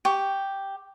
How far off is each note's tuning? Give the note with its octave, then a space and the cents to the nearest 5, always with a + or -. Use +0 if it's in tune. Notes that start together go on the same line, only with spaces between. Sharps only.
G4 +0 C#6 +15